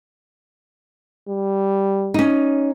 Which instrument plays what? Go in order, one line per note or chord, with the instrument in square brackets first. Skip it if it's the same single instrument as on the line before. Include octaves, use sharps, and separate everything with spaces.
[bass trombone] G3
[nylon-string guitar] C#4 D#4